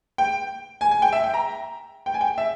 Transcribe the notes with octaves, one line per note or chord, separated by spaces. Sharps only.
G5
G#5
G#5
G5
E5
G5
A#5
G5
G#5
G5
E5